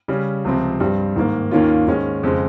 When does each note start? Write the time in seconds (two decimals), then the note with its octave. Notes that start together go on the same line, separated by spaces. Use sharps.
0.08 C#3 G3 C#4
0.45 C#2 C3 F3 C4
0.80 G2 G3 C4
1.16 G#2 D#3 A#3
1.51 D#2 D#3 A#3 C#4 F4
1.88 G#2 D#3 G#3 C#4
2.23 F2 C#3 G#3